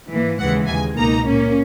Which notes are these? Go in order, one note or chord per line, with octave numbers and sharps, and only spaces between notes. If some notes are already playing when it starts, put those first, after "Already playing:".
G#2 E3 A#3
D#2 C#3 E3 G#3 F#5
D#2 C#3 G#3 G#5
C#2 B2 A#3 D#4 A#5
A#2 A#3 C#4